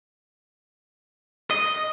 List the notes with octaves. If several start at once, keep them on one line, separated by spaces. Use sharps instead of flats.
D#5